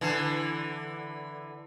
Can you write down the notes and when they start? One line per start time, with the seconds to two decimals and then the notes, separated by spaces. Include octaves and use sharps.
0.01 D3 E3